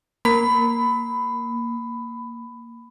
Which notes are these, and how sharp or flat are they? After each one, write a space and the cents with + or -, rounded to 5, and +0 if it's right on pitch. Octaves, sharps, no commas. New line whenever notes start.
A#3 +0 B5 +15